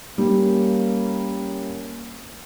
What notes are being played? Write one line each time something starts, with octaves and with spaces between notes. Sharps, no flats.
G3 A#3 C#4